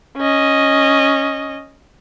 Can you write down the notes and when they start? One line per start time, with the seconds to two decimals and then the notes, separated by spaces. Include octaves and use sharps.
0.17 C#4 D#5